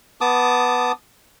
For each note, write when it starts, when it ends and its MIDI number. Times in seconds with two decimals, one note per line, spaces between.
0.21 0.92 59
0.21 0.92 81
0.21 0.92 86
0.21 0.92 87